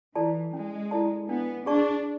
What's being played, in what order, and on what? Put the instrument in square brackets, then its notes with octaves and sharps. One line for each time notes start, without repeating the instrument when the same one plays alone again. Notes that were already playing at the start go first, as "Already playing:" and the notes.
[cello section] E3 [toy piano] E4 A4 D5 A5
[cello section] G#3 [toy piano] C#4
[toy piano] E4 A4 D5 A5
[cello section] B3 [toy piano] D4
[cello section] D4 [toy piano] G#4 D5 A5 C#6